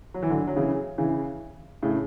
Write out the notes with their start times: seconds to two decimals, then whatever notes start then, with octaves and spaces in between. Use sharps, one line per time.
0.14 F#3
0.23 E3
0.30 D3 F#3
0.47 F#3
0.56 C#3 E3
0.98 C#3 E3
1.83 A2 C#3